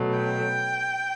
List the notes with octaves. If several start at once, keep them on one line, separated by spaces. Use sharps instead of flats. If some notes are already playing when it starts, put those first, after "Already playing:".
Already playing: B2 F#3 A3
G5